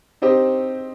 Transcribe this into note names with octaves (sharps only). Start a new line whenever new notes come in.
C4 D#4 G4 C5 D#5